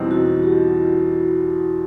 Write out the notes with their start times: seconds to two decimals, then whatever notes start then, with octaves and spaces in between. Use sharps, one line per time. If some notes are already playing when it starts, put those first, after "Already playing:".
Already playing: E2 B2 G3 C4 D#4 E4
0.11 F#4
0.43 G4